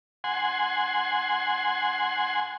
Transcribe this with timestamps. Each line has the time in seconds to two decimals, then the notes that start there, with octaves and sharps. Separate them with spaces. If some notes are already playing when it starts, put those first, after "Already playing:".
0.24 F#5 G#5 C6